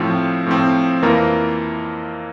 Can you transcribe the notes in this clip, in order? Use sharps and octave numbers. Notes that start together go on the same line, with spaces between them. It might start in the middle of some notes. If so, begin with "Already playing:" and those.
Already playing: A2 F3 C4
A2 F3 C4
F2 E3 A#3 F4 A#4